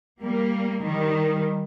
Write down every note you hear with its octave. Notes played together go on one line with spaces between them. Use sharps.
G3 A#3
D#3 G3